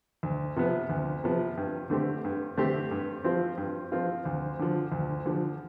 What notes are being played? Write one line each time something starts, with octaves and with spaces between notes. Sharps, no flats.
D2
C3 F3 B3
D2
C3 F3 B3
G2
D3 A3 C4 G4
G2
D3 A3 C4 G4
G2
F3 C4 F4
G2
F3 C4 F4
D2
D3 F3
D2
D3 F3